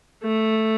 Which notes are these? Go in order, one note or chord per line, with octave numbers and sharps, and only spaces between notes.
A3